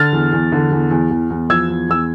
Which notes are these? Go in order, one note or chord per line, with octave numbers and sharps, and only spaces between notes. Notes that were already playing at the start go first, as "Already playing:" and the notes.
Already playing: D3 F6 A6
E2
E2
D3
E2
E2
E2
E2
F3 E6 G#6
E2
E2 E6